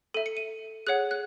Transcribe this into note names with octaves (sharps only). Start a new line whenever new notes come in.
A4 E5 D#7
C#7
D#7
G#4 C#5 F#5 F#6
F#6